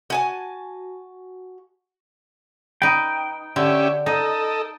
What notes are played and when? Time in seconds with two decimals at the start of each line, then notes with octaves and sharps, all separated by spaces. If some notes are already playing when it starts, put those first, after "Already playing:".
0.10 F#4 G#5 A5
2.82 D#4 B4 G5
3.56 D3 C#4 G4 E5
4.06 D#4 A4 D#5